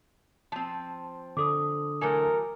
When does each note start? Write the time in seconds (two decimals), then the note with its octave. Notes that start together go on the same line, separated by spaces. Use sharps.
0.52 F3 C4 A5
1.37 D3 D4 A4 D6 D#6
2.01 E3 F#3 A3 A#4